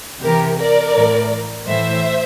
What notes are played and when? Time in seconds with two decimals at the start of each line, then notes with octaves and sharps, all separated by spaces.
0.23 C3 E3 G4 A#4
0.59 A#4 D5
0.94 A2 E3
1.66 A2 E3 C5 E5